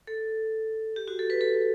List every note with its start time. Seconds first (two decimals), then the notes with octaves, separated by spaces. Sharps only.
0.07 A4
0.96 G4
1.08 F#4
1.19 A4
1.30 B4
1.41 A4